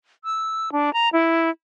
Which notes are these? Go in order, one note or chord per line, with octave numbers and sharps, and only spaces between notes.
E6
D4
A#5
E4